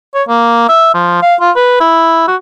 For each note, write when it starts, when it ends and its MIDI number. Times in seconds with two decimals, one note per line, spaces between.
0.14 0.23 73
0.28 0.64 58
0.69 0.90 76
0.94 1.18 53
1.22 1.35 77
1.40 1.51 65
1.56 1.79 71
1.80 2.27 64
2.28 2.36 66